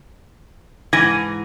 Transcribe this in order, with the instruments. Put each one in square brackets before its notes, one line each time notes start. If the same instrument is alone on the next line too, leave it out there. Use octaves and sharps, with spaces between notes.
[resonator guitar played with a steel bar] G#2 E3 G#5 [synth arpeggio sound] G#6 A#6